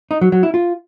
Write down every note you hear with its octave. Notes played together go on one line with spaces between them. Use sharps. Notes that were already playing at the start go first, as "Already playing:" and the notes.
D#4
F#3
F#3
E4
F4